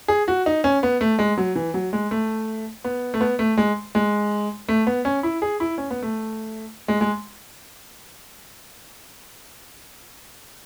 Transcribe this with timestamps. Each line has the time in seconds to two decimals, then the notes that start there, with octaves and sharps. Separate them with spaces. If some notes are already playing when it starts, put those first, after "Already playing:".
0.08 G#4
0.28 F#4
0.46 D#4
0.64 C#4
0.83 B3
1.01 A3
1.19 G#3
1.38 F#3
1.55 E3
1.74 F#3
1.93 G#3
2.11 A3
2.84 B3
3.14 A3
3.21 B3
3.39 A3
3.57 G#3
3.95 G#3
4.69 A3
4.87 B3
5.05 C#4
5.23 E4
5.42 G#4
5.60 E4
5.78 C#4
5.90 B3
6.03 A3
6.88 G#3
7.01 G#3